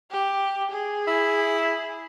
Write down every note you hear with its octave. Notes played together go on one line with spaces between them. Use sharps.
G4
G#4
E4